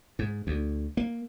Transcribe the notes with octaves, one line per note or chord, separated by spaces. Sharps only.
G#2
D2
A#3